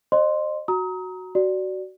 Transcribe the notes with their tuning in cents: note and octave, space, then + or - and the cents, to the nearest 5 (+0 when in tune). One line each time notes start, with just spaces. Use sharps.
C5 +30 D#5 -35 C6 +0
F#4 +0 A#5 +0 D#6 +35
F#4 +20 D5 +0